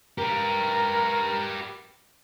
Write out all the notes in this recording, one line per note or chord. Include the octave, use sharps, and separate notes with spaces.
G4 A#4 B4